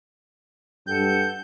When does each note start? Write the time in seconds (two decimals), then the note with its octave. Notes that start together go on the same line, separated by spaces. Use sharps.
0.87 G2 A4 F#5 G5 G6